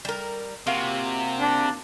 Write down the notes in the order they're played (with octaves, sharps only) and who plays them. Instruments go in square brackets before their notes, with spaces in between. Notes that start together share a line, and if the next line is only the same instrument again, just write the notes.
[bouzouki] G3 A#4
[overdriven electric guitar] C3 [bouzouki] A#3 F4 F#4
[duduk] D4